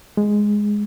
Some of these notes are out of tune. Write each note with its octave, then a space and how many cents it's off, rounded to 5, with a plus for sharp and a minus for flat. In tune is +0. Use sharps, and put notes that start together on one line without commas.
G#3 +0